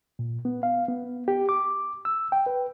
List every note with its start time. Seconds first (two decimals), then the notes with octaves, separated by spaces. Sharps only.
0.19 A#2
0.45 B3
0.63 F5
0.88 B3
1.28 G4
1.49 D6
2.05 E6
2.32 G5
2.46 B4